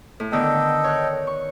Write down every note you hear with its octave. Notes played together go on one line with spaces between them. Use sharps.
A2
D3 D#3 B3 A4 D#5 G5
C#5 F#6
C#6